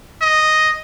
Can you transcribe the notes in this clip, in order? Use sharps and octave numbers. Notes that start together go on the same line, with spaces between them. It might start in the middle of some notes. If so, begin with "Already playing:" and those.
D#5